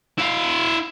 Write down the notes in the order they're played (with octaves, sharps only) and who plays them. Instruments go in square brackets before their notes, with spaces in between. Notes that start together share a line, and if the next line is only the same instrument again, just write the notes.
[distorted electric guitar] E4 F5